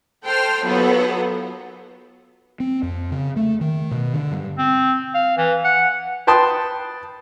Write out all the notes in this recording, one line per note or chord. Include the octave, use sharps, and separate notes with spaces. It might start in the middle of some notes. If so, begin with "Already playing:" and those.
A4 C5 G5 C6 F6
D#2 F#3 B3 F4 A4
C4
F2
C#3
A3
D#3
B2
D3
G2
C4
F5
E3
F#5
B4 G5 A5 C6 D#6